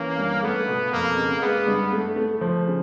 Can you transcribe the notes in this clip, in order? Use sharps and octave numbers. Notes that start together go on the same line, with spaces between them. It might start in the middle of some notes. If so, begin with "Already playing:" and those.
Already playing: E3 A#3 C#4
G2
A3 B3
B2
F2 A#3
C#3
G#3 B3
G2
A3
A3
F3
C#3